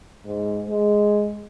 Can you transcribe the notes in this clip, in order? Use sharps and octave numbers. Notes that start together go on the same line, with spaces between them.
G#2
G#3